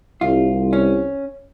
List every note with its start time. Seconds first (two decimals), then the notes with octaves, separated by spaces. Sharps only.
0.21 C2 F4
0.73 C#4